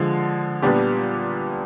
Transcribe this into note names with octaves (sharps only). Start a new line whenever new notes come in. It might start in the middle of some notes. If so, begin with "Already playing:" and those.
Already playing: D3 F3 G#3
A#2 G3 B3 D4 G4